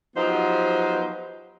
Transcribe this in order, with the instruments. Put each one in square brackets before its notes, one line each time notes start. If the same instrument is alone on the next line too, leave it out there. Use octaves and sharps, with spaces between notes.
[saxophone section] F3 F#3 B3 D#4 G4 C5